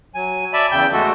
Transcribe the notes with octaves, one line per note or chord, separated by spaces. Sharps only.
F#3 G#5
D5 E5 A5 B5
E2 C#3 G5 G6
G#3 A3 F#4 A4